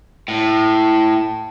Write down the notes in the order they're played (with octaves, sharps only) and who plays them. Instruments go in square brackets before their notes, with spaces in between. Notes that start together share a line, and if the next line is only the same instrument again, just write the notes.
[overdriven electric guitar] A2